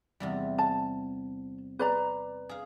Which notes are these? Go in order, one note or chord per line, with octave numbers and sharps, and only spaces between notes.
E2 C3 G3
A5
B4 D5 A#5
G#4 F5